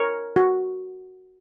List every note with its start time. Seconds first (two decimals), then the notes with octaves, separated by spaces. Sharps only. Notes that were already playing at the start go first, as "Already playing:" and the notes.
Already playing: A#4 C#5
0.36 F#4